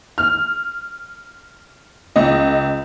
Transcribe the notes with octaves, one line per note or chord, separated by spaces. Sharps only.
F6
C#2 D#5